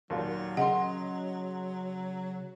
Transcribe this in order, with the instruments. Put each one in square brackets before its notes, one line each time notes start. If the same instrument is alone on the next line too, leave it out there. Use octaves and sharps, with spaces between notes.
[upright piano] D#2 A#2 [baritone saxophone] F#3
[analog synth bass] C#3 [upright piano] D#5 C6 [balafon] F#5